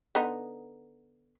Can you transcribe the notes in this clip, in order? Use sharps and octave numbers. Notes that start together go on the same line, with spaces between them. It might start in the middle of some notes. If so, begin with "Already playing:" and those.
D3 B3 D#4